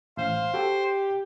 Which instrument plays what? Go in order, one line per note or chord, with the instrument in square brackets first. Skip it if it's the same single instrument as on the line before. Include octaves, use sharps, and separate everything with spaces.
[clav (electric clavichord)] A1 [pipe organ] C5 [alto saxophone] F5
[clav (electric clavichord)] F#4 A4 G5 [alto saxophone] G4